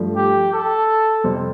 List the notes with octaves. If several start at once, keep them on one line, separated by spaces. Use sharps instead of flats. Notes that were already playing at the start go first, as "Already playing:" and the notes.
Already playing: G2 F3 A3
G4
A4
F2 C3 G3 C4